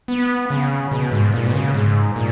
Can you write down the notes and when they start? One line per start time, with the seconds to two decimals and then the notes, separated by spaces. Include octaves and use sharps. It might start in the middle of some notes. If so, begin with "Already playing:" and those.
0.08 B3
0.50 C#3
0.91 B2
1.12 G#2
1.33 A#2
1.47 B2
1.53 C#3
1.74 G#2
2.16 A#2